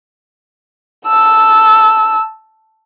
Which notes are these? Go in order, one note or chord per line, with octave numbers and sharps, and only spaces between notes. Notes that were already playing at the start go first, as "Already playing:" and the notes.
A5 E6